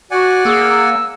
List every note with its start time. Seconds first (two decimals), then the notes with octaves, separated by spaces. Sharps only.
0.11 F#4 D5 F#5 G#5
0.45 A#3 G#4 E6